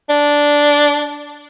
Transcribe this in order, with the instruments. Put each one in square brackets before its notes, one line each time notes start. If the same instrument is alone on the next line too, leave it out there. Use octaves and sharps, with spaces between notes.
[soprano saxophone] D4